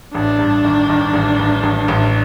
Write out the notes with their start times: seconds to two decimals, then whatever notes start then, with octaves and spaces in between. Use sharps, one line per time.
0.14 A1 D4
0.39 G2
0.65 D#3
0.90 D#3
1.13 A1
1.39 A1
1.63 A1
1.88 A1